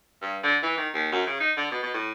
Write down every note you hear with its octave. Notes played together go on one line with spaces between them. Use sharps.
G2
D3
E3
D#3
D#2
F#2
C#3
D#4
D3
B2
B2
A2